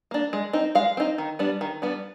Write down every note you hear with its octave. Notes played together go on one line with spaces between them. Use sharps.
A#3 D4
G#3
C4 D#4
G#3 F5
C4 D#4
D#3
G3 B3 D4
D#3
G3 B3 D4